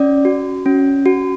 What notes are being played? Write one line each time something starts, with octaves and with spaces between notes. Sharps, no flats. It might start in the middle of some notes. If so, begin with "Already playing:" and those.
Already playing: C#4 D5
F#4
C#4
F#4